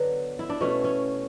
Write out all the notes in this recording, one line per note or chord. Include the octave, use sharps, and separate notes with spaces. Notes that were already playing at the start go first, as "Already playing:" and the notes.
Already playing: D3 F#3 B3
E4
D4
B2 A3 C#4
C#4